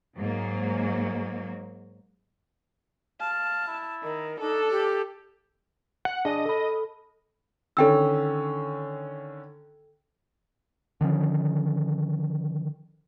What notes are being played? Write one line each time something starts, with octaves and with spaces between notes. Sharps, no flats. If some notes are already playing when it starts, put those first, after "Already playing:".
G#2 F#3 A#3
F5 A5
E4
D#3 A#4
D4 D#4 A4
G4
F#5
D4 G#4 D#5
A4 B5
D3 D#3 C#4 A4 G5 E6
D3 D#3 F3 C#4